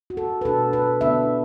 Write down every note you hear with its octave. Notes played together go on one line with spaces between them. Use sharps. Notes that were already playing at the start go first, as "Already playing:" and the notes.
F#4
A4
B4
B2 A3 D4 A4
B4
D3 B3 D4 E5